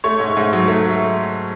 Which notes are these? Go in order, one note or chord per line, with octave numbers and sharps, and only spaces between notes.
A3 C#5
G#2
G#2
F#3
A3